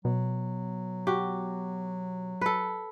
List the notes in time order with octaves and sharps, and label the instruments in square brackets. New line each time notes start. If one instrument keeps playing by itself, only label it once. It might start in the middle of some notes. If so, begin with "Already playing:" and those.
[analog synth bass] B2 [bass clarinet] F#3
[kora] F#4 G4
A4 B4